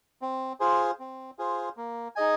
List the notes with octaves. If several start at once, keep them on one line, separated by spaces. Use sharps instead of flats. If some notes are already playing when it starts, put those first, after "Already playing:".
C4
F4 G#4 C5
C4
F4 G#4 C5
A#3
D#4 G#4 D#5 G#5